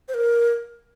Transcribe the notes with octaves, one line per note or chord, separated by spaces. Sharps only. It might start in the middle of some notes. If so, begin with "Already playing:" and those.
C5
A#4